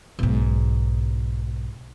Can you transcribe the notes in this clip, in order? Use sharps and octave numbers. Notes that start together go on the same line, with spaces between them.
B1 G#2